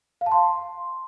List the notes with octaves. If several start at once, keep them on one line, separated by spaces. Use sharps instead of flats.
F5
A5
C6